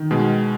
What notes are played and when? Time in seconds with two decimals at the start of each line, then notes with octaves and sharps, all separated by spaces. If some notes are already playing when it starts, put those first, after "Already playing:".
Already playing: D#3
0.11 B2 G#3